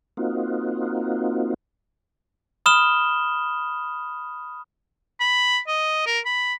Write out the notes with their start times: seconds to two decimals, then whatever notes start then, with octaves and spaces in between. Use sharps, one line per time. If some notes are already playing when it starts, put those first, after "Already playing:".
0.17 A#3 C4 D#4 F4 F#4
2.66 B5 D#6 F6 E7 G7
5.20 B5
5.67 D#5
6.06 A#4
6.25 B5